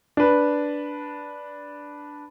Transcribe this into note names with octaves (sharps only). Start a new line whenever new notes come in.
D4 B4